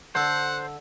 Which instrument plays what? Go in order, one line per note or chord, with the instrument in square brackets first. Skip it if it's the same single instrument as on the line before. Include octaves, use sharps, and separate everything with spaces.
[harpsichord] D3 A4 [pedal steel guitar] C5 [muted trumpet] F#5